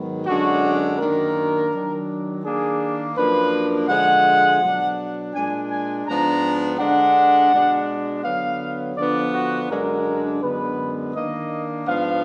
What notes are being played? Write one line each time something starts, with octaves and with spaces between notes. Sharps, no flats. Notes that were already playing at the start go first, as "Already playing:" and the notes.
Already playing: G#2 D#3 F#3 B3
F#2 D3 G#3 D4 F#4
F#2 D#3 A#3 D4 A#4
D#3 F#3 D4
D#3 A#3 D4 G#4
F#2 F3 A#3 D4 B4
D3 F3 G#3 F#5
B2 F#3 D4
A#2 G#3 D4 G#5
G#5
G#2 F3 B3 D4 A#5
D3 G#3 D4 F#5
B2 G#3 D4
D3 F#3 B3 F5
D3 F3 B3 D4 D5
F#4
F#2 D3 G#3 D4 A#4
F#2 D3 G#3 B3 B4
D#3 A#3 D4 D#5
G#2 F3 B3 D4 F5